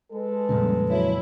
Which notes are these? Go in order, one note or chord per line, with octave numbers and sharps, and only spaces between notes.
G#3 A4 B4
F2 A#2 C#3 G3
F#3 E4 C#5